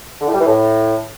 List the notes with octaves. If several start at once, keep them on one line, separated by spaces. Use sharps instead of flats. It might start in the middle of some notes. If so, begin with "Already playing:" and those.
D3
A2
G3
E3
A2